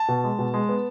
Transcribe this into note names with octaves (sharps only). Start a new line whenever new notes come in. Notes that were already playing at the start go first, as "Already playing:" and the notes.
Already playing: A5
B2
G#3
B2
G#3
B3